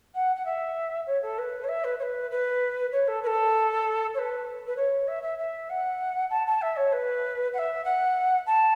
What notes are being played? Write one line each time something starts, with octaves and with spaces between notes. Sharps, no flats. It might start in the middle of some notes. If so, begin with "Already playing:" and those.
F#5
F#5
E5
C#5
A4
B4
C#5
E5
B4
C#5
B4
B4
C#5
A4
B4
A4
C#5
B4
B4
C#5
E5
E5
E5
F#5
A5
A5
E5
C#5
B4
F#5
E5
F#5
A5